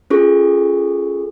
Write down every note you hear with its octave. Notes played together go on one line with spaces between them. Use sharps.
C#4 F4 G#4 A4 C#6